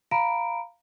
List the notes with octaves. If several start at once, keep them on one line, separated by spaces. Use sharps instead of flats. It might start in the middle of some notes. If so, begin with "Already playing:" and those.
F5 A#5 B5 D7